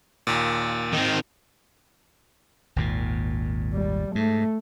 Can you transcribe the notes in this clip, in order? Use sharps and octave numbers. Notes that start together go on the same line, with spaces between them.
D#2 A#2
D#3 C4
G#1 D#2 A#2
G3
G#2 A3